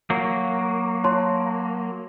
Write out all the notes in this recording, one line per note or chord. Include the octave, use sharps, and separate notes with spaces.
F#3 A#3
C#5 A5 C6